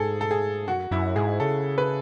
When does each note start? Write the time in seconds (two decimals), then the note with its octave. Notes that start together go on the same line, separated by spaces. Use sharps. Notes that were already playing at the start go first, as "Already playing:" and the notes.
Already playing: G#2 G#4 A4
0.21 A4
0.31 G#4
0.67 F#2 F#4
0.91 F#2 E4
1.16 G#2 G#4
1.40 C#3 A4
1.78 B4